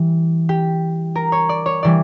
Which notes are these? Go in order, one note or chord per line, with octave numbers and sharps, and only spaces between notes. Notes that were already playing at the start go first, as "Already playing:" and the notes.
Already playing: E3 G3
G4
A#4
C#5
D5
C#5
E3 G3 D5